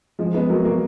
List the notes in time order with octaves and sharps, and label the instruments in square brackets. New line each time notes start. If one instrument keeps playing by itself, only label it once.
[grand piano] F3 G#3
G#3 B3
F#3 A#3
F#3 A#3